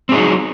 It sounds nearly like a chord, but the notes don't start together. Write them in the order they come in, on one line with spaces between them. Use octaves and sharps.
C4 G#4 D#4 F#3